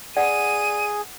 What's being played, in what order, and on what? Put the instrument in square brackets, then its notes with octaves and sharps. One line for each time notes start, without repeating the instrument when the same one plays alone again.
[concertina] G#4 [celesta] D5 [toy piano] F#5 [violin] D#7